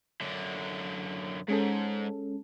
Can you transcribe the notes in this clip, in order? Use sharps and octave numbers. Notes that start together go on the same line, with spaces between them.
F#2 D3
G#2 G#3 C#4 A4